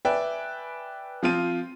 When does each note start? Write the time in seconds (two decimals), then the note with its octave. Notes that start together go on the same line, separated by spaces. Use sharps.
0.05 B4 D5 E5 G5 G#5
1.23 F3 C4 F4 D#7